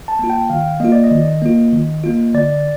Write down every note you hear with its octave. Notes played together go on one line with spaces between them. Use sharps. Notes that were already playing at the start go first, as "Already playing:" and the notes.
A5
A#3 F4
G5
D#3 F5
A#3 F4 D#5
D5
D#5
D#3
A#3 F4
D#3
A#3 F4
D3 D5